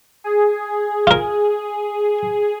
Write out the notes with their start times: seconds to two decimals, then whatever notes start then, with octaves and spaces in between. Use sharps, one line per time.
0.24 G#4
1.07 F4 A#4